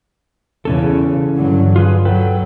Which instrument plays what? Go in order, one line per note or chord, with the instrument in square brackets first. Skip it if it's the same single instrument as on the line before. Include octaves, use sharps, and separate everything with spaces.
[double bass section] E2 C#3 [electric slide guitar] E3 C#4 A4
[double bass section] G2 D3 F#3
[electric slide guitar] F4 G#4 B4
[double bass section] F#3 [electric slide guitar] A4 B4 G5